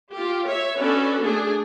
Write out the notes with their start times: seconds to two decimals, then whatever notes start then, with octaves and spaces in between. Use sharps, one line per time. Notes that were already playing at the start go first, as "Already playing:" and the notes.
0.11 F4 G4
0.46 C#5 E5
0.78 C#4 D4 F#4 A4 B4 D5
1.22 A3 D4 G#4